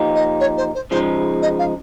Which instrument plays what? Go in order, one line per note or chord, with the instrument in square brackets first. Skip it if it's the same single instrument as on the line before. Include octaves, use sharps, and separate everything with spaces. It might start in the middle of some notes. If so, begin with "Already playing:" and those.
Already playing: [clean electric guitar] F3 A#3 D#4 G4
[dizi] D#5
C#5
C5
C5
[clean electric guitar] C#3 F3 G#3 D#4 [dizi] C5
[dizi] D#5
F5